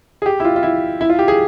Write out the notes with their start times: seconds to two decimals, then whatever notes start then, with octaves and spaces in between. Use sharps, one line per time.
0.22 G#4
0.26 G4
0.40 E4
0.45 F4
0.56 F4
0.63 E4
1.01 E4
1.10 F4
1.19 G4
1.28 G#4